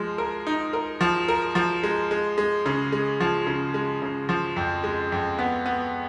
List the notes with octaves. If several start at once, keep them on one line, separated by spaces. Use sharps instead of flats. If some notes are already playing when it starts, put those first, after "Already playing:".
Already playing: F3 G#3
A#4
D#4
A#4
F3
A#4
F3
G#3
G#3
G#3
C#3
G#3
F3
C#3
G#3
C#3
F3
F2
G#3
F2
B3
B3